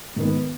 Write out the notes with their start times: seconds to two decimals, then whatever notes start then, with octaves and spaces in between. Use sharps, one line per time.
0.16 G#2 D#3 B3